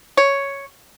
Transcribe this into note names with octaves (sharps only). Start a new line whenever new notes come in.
C#5